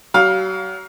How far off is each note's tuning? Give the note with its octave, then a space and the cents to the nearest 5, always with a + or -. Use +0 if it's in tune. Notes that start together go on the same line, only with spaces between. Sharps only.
F#3 +40 F5 +15